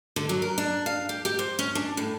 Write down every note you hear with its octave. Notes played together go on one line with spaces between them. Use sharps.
D3
F#3
A#4
D4
F5
G4
G4
C5
C#4
D4
A2